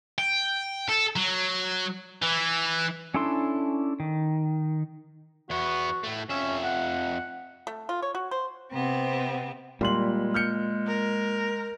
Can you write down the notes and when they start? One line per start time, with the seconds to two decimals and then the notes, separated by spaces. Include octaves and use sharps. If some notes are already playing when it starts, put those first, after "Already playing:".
0.18 G5
0.89 A4
1.16 F#3
2.22 E3
3.14 C#4 D4 E4 A4 C6
4.00 D#3
5.50 E2 B3 F#4
6.04 A2 A3
6.30 F2 C#4 E5
6.64 F#5
7.67 A3
7.89 F4
8.02 C#5
8.15 F#4
8.31 C5
8.72 C3 B3 C4
9.81 A#2 G3 G#3 C6 F#7
10.34 F6 G6 C#7
10.87 A#4